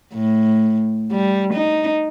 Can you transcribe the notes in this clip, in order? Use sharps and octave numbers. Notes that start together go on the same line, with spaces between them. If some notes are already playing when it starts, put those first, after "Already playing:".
A2
G3
D#4